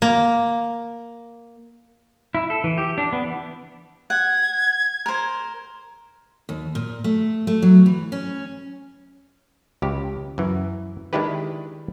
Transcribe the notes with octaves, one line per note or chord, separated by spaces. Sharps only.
A#3
E4
A4
E3
G4
D4
B3
E3
F#5 G#6
A#4 C5
D#2
A#2
A3
A3
F#3
E3
C#4
C#2 G4
F#2 E3
D#3 G#3 D4 E4 G4 B4